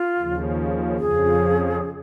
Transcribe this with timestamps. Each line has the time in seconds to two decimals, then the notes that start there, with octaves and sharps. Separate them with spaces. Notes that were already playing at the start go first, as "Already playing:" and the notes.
Already playing: F4
0.18 D#2 C#3 F3
0.99 F2 C#3 F3 G#4